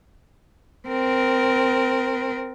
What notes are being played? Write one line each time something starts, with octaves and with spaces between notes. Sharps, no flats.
C4 A#4